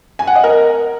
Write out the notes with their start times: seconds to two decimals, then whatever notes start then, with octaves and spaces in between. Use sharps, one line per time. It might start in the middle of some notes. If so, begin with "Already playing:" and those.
0.19 G#5
0.27 F#5
0.35 D#5
0.44 A#4